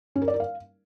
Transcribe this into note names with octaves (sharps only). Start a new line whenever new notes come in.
C#4
A#4
D5
A#4
F5